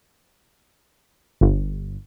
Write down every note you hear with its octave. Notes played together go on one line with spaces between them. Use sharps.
G1